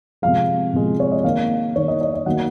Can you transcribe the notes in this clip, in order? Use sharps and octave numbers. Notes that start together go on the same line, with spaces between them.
C3 F3 G#3 F5
C3 F3 G#3
C#5
D#5
D#3 A#3 F5
D#3 A#3 C#5
D#5
D#5
D#5
D#3 F#3 A#3 F#5